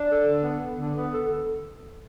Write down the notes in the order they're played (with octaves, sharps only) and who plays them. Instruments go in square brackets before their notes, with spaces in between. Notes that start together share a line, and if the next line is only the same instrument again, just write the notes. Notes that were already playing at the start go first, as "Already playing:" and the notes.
Already playing: [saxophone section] D4
A4
D3
B3
B3
D3
B3
A4
A4